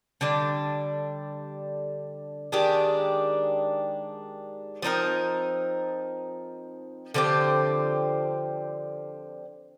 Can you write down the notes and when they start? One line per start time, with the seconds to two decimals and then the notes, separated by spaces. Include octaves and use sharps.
0.21 D3 G3 D4
2.52 D#3 G#3 D4 G4
4.82 F3 C4 D#4 A#4
7.14 D3 F3 C4 G4